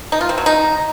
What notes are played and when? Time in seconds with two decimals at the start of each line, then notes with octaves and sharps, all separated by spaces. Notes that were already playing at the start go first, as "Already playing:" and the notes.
0.12 D#4
0.21 F4
0.29 C4
0.38 F#3
0.46 D#4